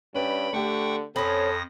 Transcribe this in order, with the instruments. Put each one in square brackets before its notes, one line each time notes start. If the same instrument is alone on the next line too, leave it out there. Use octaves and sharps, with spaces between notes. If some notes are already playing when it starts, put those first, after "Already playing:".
[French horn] G2 [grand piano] C#4 B4 D5 [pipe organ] G5 B5
[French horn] D3 [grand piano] A3 G4 [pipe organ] F#5 G5 C#6
[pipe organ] F2 D#6 A#6 [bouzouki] C4 C#4 [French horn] A4 [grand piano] B5 F#7